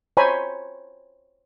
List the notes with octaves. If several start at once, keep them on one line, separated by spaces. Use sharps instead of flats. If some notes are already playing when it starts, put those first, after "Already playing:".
C5 C#5 G#5 A#5 B5